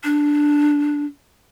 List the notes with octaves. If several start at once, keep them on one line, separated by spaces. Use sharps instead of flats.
D4